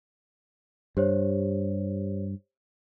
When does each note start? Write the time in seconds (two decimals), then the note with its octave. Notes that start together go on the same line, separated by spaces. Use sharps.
0.97 G2 G4 C5 C#5